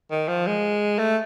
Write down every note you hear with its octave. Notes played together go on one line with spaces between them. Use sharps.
D#3
F3
G#3
A3